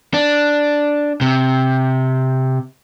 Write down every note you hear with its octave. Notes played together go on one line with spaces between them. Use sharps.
D4
C3